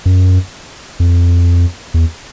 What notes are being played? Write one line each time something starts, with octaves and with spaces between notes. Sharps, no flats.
F#2
F2
E2